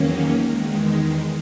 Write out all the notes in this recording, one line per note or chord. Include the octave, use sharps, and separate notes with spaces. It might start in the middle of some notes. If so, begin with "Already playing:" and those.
Already playing: E2 D#3 F#3 A#3 C#4
E2 D#3 G#3